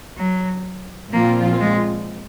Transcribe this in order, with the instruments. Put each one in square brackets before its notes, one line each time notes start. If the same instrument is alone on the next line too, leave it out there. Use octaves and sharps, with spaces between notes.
[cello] F#3
[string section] A#2 F3 C4 F4 [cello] A#3
[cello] G#3